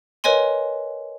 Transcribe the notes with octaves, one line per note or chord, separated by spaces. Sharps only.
A#4 B4 C#5 D#5 G#5 C6